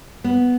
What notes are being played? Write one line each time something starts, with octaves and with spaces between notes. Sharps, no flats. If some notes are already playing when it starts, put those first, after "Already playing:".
B3